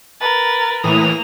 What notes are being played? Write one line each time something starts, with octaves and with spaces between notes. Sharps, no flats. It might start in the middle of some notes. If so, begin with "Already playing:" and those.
A#4 B4 A6
A2 E3 A#3 D#6 F7